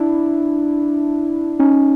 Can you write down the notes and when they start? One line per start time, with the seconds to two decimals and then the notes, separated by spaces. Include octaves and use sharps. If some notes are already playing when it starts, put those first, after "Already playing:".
Already playing: D4 E4
1.59 C#4 D#4